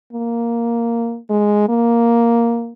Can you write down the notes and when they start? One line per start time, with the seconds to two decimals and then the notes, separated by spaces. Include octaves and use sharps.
0.13 A#3
1.30 G#3
1.69 A#3